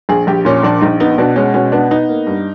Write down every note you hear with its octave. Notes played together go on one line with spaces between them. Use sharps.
A#1 G#4
A#1 G4
A#2 C#4
A#1 D4
A#1 D#4
B3 D#4
B2 D4
G#3 C#4
B2 C#4
B3 D4
B3 D#4
A#3
G2